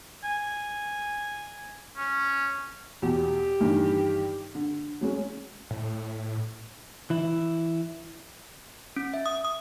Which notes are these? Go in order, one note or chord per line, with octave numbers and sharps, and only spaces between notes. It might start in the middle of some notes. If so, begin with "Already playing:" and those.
G#5
C#4
E2 B2 G4
G2 D#3 E3
D3
F#3 G#3 C#4
A2
E3 E4
C#4
E5
D#6
D#6